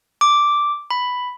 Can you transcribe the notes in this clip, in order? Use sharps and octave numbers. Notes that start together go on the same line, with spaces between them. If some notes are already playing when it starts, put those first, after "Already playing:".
D6
B5